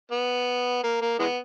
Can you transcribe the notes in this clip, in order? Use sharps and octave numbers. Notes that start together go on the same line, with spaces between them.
B3
A#3
A#3
E3 G#3 B3